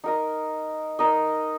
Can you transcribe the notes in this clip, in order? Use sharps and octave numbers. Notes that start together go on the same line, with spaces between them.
D#4 A#4 D#5
D#4 A#4 D#5